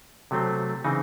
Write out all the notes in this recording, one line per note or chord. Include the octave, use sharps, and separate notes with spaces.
C3 F#3 A3 C4
C#3 E3 C4 D#4